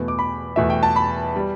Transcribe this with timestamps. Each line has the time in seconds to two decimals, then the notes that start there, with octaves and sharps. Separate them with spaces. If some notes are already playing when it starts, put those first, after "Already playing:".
Already playing: E2 B2 A3
0.08 D6
0.19 B5
0.56 E2 B2 A3 E5
0.70 G5
0.83 A5
0.96 B5
1.36 G3